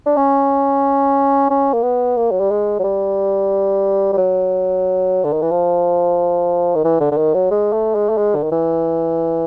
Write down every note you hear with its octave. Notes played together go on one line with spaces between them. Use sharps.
D4
C#4
C#4
A#3
B3
A#3
F#3
G3
G#3
F#3
G3
G3
F#3
D3
D#3
E3
F3
D#3
E3
D3
D3
D#3
F#3
G#3
A3
G#3
A3
G#3
D3
D#3
E3